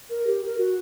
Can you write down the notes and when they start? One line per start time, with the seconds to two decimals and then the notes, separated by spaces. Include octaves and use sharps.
0.10 A#4
0.27 G4
0.45 A#4
0.58 F#4